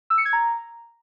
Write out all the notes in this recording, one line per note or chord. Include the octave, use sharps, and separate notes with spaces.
E6
C#7
G#6
A#5